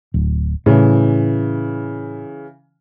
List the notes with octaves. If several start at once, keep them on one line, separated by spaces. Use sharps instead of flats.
D1
A2 C#3 E3